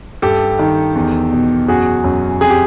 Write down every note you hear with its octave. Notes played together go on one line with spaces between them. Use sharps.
G2 G4 A4
D#3
E2
B2
F#2 F#4 G#4
F#2
F2 G#4
G4